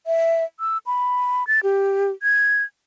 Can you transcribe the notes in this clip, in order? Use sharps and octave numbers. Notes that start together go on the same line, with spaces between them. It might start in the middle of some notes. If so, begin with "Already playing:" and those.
E5
E6
B5
A6
G4
G#6